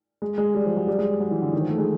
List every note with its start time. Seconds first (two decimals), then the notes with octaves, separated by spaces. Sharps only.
0.22 G#3
0.38 G#3
0.55 G3
0.66 F3
0.77 F#3
0.87 G3
0.99 G#3
1.20 F#3
1.31 E3
1.42 D3
1.53 D#3
1.61 F3
1.70 A3
1.78 G#3